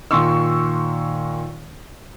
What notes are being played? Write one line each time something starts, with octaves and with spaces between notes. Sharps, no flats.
A#2 D#3 C6 C#6 E6